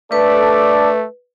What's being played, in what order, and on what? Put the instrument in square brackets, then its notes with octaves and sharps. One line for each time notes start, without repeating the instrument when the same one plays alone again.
[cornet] A3 [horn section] D4 A4 D5 [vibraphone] B4